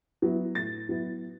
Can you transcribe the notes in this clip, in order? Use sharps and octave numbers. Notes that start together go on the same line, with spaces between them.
F#3 B3 E4
A2 A6
F#3 B3 E4